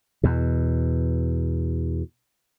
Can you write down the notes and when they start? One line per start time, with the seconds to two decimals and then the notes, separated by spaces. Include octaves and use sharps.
0.23 E2 B2